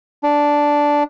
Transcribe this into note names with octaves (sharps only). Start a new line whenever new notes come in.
D4